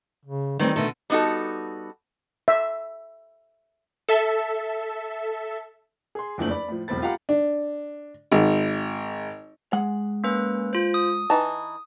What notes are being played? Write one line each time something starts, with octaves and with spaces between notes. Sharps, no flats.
C#3
D#3 E3 G3 A3 C4
B2 D3 A3 A4
G3 B3 D#4 F#4 A4
E5
A4 E5
G#4 C6
F#1 E2 F3 A3 D4 F#7
D5 B5
A2 F3
E1 B1 C4 B5 A6
F4 G4 F5 F#5 A#5 B5
D4
G#1
G#3 F#5
A#3 C#4 B4
F4 C5
D#6
E3 D#4 A5